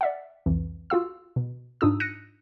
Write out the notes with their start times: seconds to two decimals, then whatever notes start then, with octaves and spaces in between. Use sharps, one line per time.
0.01 D5 E5 F#5
0.46 C2 F2 E3
0.90 F4 F#4 F5 E6
1.36 B2
1.81 G#2 D4 D#4 F4 D#6 E6
2.00 F#6 A#6 C#7 D#7